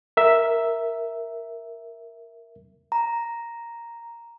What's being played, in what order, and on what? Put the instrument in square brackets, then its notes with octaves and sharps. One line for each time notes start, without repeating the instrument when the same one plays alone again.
[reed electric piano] A#4 E5
[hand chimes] A#5